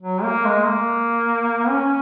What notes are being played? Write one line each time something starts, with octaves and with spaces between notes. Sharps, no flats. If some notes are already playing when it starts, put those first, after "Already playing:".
F#3
A#3
G#3
A#3
C#4